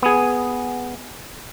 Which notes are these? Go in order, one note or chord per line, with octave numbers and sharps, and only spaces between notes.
B3 G#4